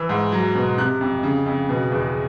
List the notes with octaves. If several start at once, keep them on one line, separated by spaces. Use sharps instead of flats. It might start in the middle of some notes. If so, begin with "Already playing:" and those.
Already playing: E3 E6
G#2
F#3
B2
C3 F#6
F2
C#3
F2
B2
E2